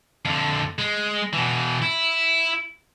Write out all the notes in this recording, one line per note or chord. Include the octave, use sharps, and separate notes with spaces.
F2 D3
G#3
B2 E3
E4